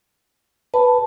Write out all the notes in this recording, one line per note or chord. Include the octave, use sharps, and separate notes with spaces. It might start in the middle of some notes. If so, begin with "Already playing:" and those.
B4 A5